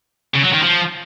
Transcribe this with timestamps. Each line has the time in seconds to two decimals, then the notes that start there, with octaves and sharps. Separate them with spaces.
0.35 C#3
0.45 F#3
0.54 D#3
0.64 F3